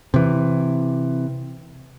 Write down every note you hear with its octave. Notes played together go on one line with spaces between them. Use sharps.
C3 E3